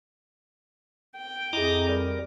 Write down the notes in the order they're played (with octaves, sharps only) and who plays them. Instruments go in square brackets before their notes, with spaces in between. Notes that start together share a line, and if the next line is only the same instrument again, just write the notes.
[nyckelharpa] G5
[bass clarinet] F2 [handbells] E4 G#4 [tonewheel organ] D#5 A#5 D6
[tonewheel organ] G3 A#4 [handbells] D5